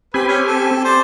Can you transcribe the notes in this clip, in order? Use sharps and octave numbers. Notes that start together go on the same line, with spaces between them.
C4 G4 B4 G#5
C#4
A4
C5 D5 A5